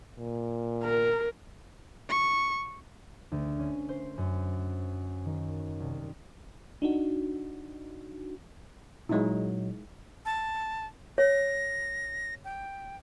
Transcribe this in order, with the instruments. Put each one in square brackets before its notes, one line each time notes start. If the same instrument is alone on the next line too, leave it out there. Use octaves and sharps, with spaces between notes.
[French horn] A#2
[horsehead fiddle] A#4
[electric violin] C#6
[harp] D2
C#4
C5
F#2
D#3
C2
[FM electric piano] D4 D#4 F#4
[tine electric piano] A#2 F#3 [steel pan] G#3 D#4 E4
[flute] A5
[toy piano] C#5 [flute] A#6
[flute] G5